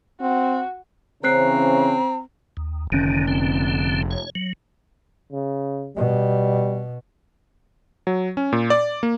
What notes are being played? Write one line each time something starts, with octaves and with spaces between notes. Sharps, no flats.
C4 F#4
C#3 E3 C4 C#4 C5 A#5 F#6 C7
D#2
F1 D3 D#3 C#4
D3 C4
C#5
F#3
C#3
B2 G3
F#3
C#4
A#2
D5
A#3